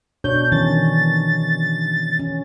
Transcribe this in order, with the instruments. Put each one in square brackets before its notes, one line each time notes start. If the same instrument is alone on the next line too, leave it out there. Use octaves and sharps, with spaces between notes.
[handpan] B2 D4 C#5 [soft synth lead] G6
[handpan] D#3 E3 C#4 [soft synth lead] A6
[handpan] C#4